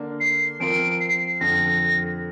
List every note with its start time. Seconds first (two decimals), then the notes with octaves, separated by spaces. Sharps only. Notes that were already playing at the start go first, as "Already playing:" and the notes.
Already playing: D3 A#3 D4
0.20 C7
0.60 F3 C4 F4 A#4 D7
1.00 C7
1.41 F2 D3 F3 A#6